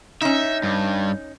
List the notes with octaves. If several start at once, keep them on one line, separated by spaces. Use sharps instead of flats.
C#4 D#4 E5
G2